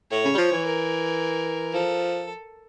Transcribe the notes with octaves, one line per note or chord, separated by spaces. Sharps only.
A2 C#5
C#3
G3
F3
E3
A#4
F3 A4